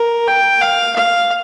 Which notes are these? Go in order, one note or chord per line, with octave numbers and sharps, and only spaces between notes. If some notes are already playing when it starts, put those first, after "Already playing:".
Already playing: A#4
G5
F5
F5